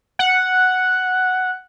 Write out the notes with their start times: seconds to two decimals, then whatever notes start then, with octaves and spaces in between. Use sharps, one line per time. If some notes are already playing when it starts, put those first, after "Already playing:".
0.19 F#5